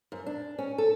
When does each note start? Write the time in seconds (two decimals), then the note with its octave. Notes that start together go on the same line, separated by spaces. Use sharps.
0.12 F#2
0.26 D4
0.58 C#4
0.78 A4